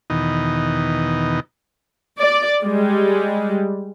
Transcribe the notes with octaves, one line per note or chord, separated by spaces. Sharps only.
E2 B2 D#3 D#4
D5
G3 G#3